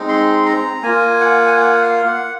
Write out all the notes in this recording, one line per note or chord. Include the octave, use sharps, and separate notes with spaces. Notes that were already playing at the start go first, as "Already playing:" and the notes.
Already playing: G#3 C4 D#4
C6
A#5
A#3 F4 G#5
F#5
G#5
F#5
F5
F#5